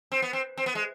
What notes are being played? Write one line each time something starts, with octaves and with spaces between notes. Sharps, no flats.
C4
B3
C4
C4
B3
G#3